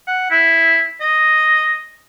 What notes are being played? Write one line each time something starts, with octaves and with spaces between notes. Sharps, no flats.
F#5
E4
D#5